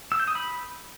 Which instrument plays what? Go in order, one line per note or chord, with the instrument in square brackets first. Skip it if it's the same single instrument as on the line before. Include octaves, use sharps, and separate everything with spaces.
[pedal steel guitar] E6
G6
D#6
B5